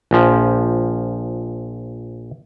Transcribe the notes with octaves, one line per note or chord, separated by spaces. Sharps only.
A#1 F3